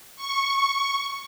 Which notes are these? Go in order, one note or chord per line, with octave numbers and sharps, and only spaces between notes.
C#6